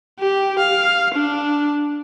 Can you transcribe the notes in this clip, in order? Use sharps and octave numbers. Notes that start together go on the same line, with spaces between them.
G4
F5
D4